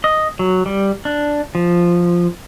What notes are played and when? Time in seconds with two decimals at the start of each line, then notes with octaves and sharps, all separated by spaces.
0.04 D#5
0.39 F#3
0.66 G3
1.05 D4
1.55 F3